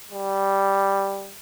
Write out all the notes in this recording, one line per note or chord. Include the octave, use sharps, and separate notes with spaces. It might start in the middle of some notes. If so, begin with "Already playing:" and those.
G3